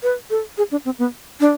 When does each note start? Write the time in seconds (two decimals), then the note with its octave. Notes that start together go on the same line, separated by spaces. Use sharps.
0.03 B4
0.30 A4
0.58 G#4
0.71 D4
0.85 C4
0.99 B3
1.40 D4